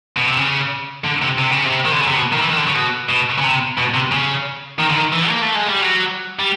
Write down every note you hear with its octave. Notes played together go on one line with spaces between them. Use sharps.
B2
C3
C#3
D3
C3
C3
C#3
C3
D#3
D3
C#3
C3
B2
D#3
E3
D#3
D3
C#3
B2
B2
C#3
C3
B2
C3
C#3
D#3
D3
D#3
E3
A#3
A3
G#3
G3
F#3
G3